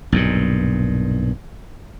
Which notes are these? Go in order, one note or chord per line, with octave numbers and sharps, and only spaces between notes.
B1 G2 A#2